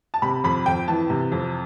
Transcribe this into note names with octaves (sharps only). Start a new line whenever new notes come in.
A5
C3 B5
F2 B5
F2 G5
E3 A5
C3
F2